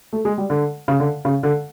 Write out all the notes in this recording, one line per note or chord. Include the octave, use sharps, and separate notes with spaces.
A3
G#3
G3
D3
C#3
D3
C#3
D3